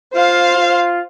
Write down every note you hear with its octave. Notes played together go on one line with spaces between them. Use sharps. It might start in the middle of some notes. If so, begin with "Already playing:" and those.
F4 C5 F5
F4